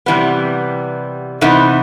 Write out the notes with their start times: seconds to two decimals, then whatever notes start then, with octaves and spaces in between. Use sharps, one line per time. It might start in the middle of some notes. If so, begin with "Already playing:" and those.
0.06 C3 E3 G3 B3
1.41 C3 E3 B3 D#4